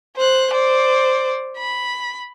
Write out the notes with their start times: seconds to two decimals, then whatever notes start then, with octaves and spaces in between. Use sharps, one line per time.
0.17 C5 F#6
0.51 C5 D5
1.58 B5